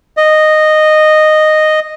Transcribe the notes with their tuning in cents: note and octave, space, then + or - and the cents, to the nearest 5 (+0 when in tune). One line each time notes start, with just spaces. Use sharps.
D#5 -10